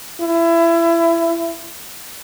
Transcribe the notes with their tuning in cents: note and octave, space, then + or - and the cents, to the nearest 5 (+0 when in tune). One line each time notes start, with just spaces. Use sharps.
E4 +25